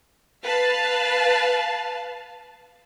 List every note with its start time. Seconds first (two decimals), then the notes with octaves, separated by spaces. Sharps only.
0.43 B4 F5 A5